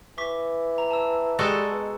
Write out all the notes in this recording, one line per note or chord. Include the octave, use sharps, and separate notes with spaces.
E3 C#6 D6 B6
A#5
A5 E6
G3 G#3 F#4 A4
B2